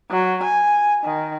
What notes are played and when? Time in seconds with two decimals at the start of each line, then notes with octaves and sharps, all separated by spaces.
0.11 F#3
0.43 G#5
1.03 D#3